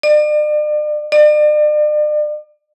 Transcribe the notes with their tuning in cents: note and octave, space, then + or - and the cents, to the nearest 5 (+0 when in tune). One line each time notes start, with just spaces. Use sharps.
D5 +40
D5 +40